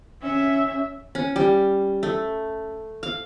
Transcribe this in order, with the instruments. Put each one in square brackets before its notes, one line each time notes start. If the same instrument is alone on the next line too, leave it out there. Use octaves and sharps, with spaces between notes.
[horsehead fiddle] C#4 E5
[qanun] C#4
G3
A3
F5